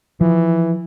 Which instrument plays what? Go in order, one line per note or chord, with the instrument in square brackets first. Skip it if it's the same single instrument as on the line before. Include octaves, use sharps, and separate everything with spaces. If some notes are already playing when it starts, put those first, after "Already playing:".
[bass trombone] E3 [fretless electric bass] F3